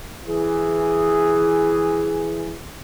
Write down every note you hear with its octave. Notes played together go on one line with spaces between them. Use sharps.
E3 G#4